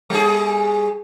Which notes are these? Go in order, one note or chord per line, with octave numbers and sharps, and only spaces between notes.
G3 G#4